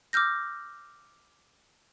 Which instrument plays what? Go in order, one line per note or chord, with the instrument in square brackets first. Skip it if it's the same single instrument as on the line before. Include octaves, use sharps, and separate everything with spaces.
[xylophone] D6 E6 F6 G6 A#6